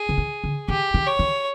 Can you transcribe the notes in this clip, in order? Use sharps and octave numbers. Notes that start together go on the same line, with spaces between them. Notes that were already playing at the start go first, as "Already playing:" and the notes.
Already playing: G#4
D3
D#3
D3
D#3 G4
D#3
C#5
D#3